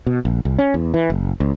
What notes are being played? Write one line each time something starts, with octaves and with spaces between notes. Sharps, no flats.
B2
A#1
C2
C#4
E2
E3
F#1
C#2